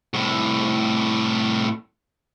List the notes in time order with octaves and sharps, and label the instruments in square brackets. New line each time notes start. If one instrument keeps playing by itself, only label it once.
[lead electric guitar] C2 A2